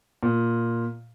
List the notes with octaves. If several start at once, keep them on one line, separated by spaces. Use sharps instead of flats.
A#2